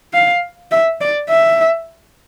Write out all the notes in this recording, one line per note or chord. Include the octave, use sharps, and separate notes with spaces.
F5
E5
D5
E5